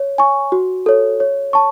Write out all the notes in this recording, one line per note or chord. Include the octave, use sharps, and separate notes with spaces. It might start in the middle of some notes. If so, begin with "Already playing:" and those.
Already playing: C#5
G#5 C#6
F#4
A4 C#5
C#5
A5 C#6